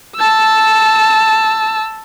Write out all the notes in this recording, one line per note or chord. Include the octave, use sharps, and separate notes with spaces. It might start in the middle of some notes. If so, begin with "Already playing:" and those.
A5 E6